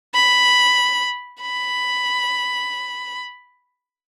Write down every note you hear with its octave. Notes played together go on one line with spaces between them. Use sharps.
B5
B5